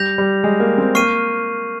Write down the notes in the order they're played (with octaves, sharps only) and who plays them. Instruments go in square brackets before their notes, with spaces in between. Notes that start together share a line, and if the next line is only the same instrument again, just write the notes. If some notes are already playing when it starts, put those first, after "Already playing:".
Already playing: [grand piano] G3 [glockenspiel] G6 A#6 F7
[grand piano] G3
G#3
A#3
C4
[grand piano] A#3 [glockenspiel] C#6 F6 C7 D#7